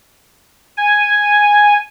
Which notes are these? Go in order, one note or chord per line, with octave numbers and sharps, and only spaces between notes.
G#5